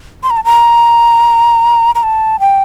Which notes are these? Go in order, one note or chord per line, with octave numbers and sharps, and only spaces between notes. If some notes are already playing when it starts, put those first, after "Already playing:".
C6
A#5
A5
A#5
A#5
A5
G5